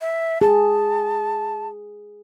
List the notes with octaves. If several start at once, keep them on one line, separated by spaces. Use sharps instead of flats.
E5
G#4 A5